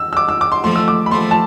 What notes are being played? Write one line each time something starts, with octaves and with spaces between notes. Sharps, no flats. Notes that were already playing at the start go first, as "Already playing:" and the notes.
Already playing: E6
E6
D6
E6
D6
C6
F3 A3 C6
E6
D6
B5
F3 A3 C6
A5